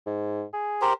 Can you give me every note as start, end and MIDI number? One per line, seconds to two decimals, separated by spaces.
0.06 0.43 44
0.53 0.86 68
0.81 0.93 67
0.81 0.93 70
0.81 0.93 72